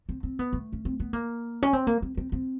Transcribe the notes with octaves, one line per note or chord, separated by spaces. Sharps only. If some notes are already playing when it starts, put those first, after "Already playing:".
C4
C4
B3
A3
C#4
C4
B3
A#3
C#4
C4
A#3
C4
C4
C4